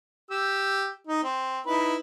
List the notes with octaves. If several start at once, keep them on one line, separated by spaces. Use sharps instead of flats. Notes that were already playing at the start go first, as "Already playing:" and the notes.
G4 E6
D#4
C4
D#4 E4 B4